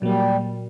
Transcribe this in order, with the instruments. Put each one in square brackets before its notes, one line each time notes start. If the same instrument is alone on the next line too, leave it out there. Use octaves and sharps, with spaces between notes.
[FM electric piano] A#2 F#3 A#3 [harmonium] G3